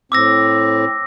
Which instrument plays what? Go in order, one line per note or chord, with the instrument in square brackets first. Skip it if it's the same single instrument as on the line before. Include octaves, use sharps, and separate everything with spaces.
[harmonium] A2 C4 [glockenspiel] D6 E6 A#6